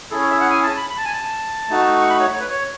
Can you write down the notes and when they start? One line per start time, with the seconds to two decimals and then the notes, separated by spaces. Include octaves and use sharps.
0.10 C#4 E4 G#4 A4
0.20 C#5
0.31 E5
0.40 F#5
0.50 G#5
0.63 A5
0.77 B5
0.90 B5
0.98 A5
1.05 G#5
1.13 A5
1.70 A3 D#4 F#4
2.01 C#6
2.10 B5
2.20 C#5
2.33 C#5
2.40 B4
2.49 C#5